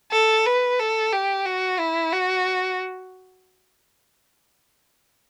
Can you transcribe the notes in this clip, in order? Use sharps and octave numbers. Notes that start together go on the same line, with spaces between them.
A4
B4
A4
G4
F#4
E4
F#4